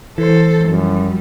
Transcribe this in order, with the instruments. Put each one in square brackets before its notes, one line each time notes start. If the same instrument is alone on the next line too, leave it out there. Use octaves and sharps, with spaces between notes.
[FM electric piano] E3 [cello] A4 C5
[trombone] F#2 [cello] F3 G3